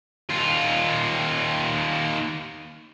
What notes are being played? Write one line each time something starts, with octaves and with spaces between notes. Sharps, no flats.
D#2 F4